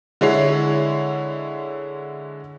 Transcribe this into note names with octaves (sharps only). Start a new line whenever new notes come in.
D3 G#3 E4 C#5 C7